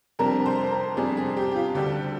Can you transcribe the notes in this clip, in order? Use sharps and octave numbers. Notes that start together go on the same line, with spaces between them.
F2 C3 G3 D4 A#4
C5
A#4
F2 C3 G3 D4 G#4
G#4
G4
G4
F4
D2 D3 G3 D4 G4